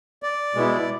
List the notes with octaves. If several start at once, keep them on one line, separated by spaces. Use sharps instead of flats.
D5
B2 G#3 B3 E4